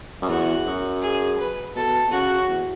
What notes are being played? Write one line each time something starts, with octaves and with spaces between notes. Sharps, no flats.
F#2
E2 F#4
F#2
G#4
B4
B2 A4
B2
C#3 F#4
E2